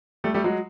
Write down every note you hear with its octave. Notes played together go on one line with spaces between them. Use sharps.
G3 A3
G3 A3
F#3 G#3